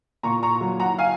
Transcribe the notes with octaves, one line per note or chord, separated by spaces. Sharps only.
A#2 A#5 C#6
A#5 C#6
F#3
F#5 A#5
F5 G#5